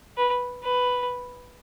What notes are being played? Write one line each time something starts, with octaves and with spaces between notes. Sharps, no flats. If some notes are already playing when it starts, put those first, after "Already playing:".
B4
B4